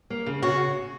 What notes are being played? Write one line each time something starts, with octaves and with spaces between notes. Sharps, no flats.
A#3
C#3
C#3 F#4